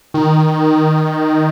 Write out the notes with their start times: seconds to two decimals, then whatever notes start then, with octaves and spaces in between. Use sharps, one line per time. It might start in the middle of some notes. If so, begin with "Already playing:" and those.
0.14 D#3